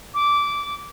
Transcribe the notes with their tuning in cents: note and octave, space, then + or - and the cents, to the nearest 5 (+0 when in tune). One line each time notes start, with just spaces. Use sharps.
D6 -15